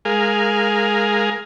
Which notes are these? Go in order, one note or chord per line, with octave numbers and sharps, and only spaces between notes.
G#3 G#4 A#4 F5